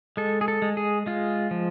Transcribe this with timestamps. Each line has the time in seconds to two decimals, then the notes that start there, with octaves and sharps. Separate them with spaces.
0.17 G#3 A4
0.41 G#4
0.48 A4
0.62 G#3
0.77 G#4
1.06 G#3 F4
1.51 F3